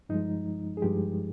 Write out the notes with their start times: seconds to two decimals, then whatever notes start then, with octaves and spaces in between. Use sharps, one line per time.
0.09 G2 F3 G#3 D#4
0.77 G#4
0.82 G2 F3 G#3 G4